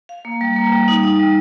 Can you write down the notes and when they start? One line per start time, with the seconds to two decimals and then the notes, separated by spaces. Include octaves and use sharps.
0.09 F5
0.25 A#3
0.41 G3
0.56 A#3
0.72 G3
0.88 D#4
1.03 D#4
1.19 G3